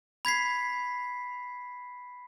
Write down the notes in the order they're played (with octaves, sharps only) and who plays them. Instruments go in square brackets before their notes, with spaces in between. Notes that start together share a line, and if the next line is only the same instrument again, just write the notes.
[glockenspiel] B5 G#6 B6 C7